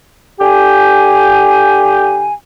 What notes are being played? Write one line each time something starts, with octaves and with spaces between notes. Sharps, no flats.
D3 G4 G5 G#5